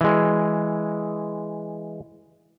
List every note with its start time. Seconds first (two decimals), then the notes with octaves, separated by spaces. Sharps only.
0.01 E3 G#3